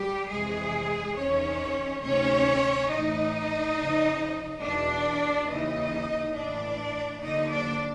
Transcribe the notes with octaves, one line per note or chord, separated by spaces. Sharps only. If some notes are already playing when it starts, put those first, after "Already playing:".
Already playing: G3 G4
F2 C3 E3 G#3 G#4
E2 C3 D#3 C#4 C#5
D2 C3 D#3 C#4 C#5
A2 E3 D#4 D#5
F2 C#3 F3
E2 B2 D4 D5
D#2 C#3 E3 D#4 D#5
A2 E3 D4 D5
D#2 D3 F3 D#4 D#5
D4 D5